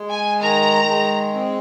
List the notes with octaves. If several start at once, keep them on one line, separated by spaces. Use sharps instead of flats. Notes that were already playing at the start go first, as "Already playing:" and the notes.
Already playing: G#3
G#5
D#3 A#5
G#3
C4